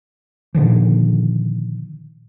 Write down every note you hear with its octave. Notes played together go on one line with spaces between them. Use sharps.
A#2 D3 D#3 F3